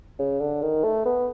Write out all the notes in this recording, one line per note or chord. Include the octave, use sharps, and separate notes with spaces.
C#3
D3
D#3
A3
B3